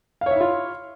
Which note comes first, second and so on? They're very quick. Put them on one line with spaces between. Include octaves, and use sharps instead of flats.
F5 C#5 E5 E4 F4